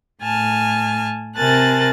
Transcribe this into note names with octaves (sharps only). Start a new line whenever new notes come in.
A2 G#5 A5 F6
C3 A#4 G#5 A5 F#6 A6